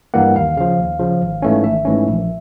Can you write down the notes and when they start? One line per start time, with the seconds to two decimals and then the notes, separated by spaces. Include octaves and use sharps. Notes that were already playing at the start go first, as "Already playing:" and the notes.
0.14 G2 E3 G3 A#3 F#5
0.36 D#2 F5
0.57 C#3 F3 F5
0.78 D#2
0.99 C#3 F3
1.22 G#1
1.42 G#2 E3 A3 C#4
1.64 G#1 E5
1.85 G#2 E3 A3 C#4
2.07 A#1